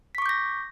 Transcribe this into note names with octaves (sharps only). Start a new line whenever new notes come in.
C#6 D6 G6 A#6 B6